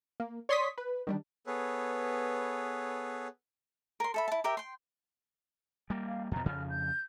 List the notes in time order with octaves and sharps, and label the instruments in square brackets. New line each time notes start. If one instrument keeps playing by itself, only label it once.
[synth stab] A#3
C#5 D5 C6 C#6 D#6 B6
B4
D#3 G3 D4
[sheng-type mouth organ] B3 G#4 A4 B4 C#5
[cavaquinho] A#4 C6
A4 E5 B5
E4 A5
G4 A#4 E5 G5
G5 C6
[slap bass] G3 A#3
[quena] F5
[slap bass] F2 B2 [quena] A#5
[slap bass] F2 C#3 F3 [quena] F6
[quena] G6